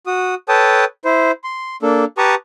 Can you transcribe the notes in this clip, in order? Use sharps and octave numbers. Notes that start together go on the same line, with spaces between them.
F#4 D#6
A4 B4 C#5 G5 A5 D#6
E4 C5
C6
A#3 D4 A4
G4 B4 A5 A#5 C#6 D#6